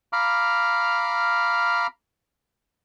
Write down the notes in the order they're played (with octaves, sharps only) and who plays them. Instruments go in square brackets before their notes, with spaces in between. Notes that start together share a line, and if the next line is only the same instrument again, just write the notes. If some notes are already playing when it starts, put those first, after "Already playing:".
[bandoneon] F5 A#5 B5 D6 F6